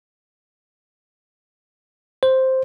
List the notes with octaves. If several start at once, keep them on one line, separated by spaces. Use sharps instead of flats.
C5